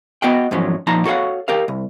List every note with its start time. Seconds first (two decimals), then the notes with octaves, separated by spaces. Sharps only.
0.22 B3 F#4 D#5 F#5 G5
0.51 E2 G#2 F3 F#3 C#4
0.87 A#2 F3 D#4 A5 A#5
1.05 F#4 A4 C#5 F5 F#5
1.48 G4 A#4 F5
1.68 C2